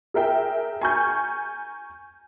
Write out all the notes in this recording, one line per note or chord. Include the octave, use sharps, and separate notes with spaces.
G#4 A#4 E5 G5
G#5 A#5 C#6 F6 G6